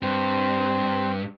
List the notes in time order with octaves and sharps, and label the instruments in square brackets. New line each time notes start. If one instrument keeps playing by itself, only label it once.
[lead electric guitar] G2 [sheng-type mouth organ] C4